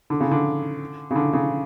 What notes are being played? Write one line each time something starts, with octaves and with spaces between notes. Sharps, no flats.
D3
C#3
D3
C#3
D3
C#3